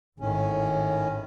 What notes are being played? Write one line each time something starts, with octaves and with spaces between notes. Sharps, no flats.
G#1 A2 D#3 C#4